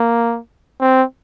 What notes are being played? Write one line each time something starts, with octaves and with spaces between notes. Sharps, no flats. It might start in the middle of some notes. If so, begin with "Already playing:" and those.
Already playing: A#3
C4